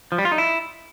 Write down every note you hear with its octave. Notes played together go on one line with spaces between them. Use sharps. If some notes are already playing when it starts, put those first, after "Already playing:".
F3
G3
F4
D#4
E4